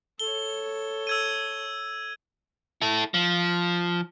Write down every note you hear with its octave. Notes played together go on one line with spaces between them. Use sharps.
A4 C#5 G7
E6 G#6 D#7
E4 A4
F3